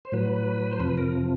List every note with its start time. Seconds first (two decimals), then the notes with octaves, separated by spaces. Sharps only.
0.05 C5
0.12 A2 F#3 B4
0.71 C5
0.80 F2 C3 F3 B4
0.97 A#4